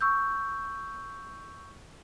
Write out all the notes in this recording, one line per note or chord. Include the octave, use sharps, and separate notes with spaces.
C#6 E6 G6